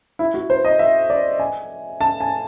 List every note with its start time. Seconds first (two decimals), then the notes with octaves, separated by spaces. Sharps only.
0.19 E4
0.34 F#4
0.50 C5
0.65 D#5
0.79 E5
1.10 D5
1.40 G#5
2.01 A5
2.21 G#5